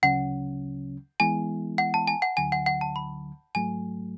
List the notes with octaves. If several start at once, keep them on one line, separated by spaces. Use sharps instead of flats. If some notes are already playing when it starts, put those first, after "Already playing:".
D2 C#3 F#3 C#4 F#5
E3 G#3 B3 E4 G#5
F#5
A5
G#5
F#5
D2 D3 F#3 G#5
F#5
F#5
A5
B5
G#2 F#3 A3 G#5